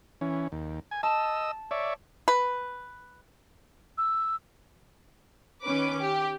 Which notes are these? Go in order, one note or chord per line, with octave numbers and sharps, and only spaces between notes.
E3 C#4
D#2
G#5
D#5 A5 E6
C#5 D5 E5
B4
E6
D#3 C#4 B4 D6
G4